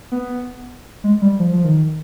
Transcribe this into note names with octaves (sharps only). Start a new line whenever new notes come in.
B3
G#3
G3
F3
F3
D#3